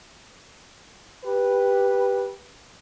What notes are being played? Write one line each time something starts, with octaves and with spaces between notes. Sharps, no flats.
G4 B4